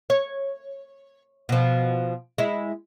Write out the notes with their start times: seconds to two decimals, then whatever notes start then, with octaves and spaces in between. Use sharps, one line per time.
0.10 C#5
1.49 B2 F3
2.38 G#3 E4